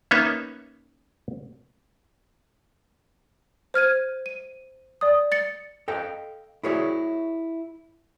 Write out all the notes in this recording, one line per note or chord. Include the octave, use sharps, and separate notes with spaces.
A#3 B3 C#4 D#4 C#5 E5
C5 F6 G#6 D#7
D#7
D5 D#6
A6 C#7
A4 D#5 F5 G5
E4 F#4 G#4 C#5 D5 E5